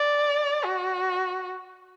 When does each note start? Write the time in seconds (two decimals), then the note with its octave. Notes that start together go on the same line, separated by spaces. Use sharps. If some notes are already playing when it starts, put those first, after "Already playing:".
Already playing: D5
0.65 F#4